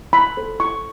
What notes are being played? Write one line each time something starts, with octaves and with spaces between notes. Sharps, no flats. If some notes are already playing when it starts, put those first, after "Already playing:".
E4 B5
A4 C5
E4 C#6